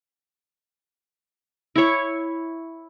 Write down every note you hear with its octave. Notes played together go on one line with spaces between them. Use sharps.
E4 C#5